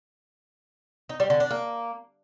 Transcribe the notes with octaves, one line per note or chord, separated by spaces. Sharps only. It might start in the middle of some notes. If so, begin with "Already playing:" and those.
D#4
G3
D3
D4
A#3